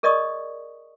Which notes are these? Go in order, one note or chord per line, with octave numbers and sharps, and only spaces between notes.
G#4 A#4 D5 D#5 C#6 D#6